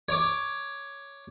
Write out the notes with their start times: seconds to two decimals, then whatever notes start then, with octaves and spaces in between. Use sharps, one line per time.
0.09 C#5 D6